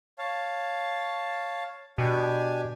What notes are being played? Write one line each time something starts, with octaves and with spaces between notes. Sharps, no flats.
C#5 F5 A5
B2 D4 G4 G#5